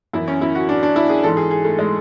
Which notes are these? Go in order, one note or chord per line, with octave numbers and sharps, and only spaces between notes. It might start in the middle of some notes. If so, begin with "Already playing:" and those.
F#2 E3 E4
C#4
E4
F#4
D4
D4
E4
G#4
G#2 E3 A4
G#4
G#4
A3
G#3